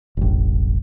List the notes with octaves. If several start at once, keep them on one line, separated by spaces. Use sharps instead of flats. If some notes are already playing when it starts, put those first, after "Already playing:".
E1 A1